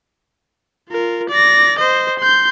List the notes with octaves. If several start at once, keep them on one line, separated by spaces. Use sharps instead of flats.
F4 A#4
D5 A#6
C5 D#5
C6 G6